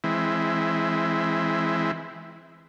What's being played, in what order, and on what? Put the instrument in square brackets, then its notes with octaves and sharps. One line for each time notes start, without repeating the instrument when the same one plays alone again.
[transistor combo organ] E3 G#3 C4 E4